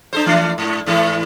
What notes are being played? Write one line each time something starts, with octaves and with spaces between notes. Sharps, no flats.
D4 A4 C5
E3 A3 D4
G#2
G#2 E3 A4